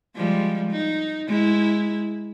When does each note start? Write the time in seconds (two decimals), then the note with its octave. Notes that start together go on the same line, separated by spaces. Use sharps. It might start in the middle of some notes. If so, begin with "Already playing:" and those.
0.16 F3 G3 G#3
0.71 D#4
1.28 G#3 E4